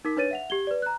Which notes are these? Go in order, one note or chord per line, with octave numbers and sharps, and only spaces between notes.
D#4 A#4 D6 B6
D4 B4 C#5 A6 D#7
E5 F#5 F7
G4 G#6 G7
B4 D5
A#5 F#6